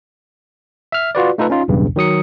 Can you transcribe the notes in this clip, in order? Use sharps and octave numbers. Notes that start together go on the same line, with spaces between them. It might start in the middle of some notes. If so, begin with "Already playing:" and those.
E5 F6
F4 F#4 B4 D5
A3 D#4 F4 A4 B4
C#4 D#4 F4
B1 E2 G2 C#3
D#3 F#3 D#6 C#7